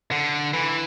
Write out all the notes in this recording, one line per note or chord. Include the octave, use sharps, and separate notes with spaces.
D3
E3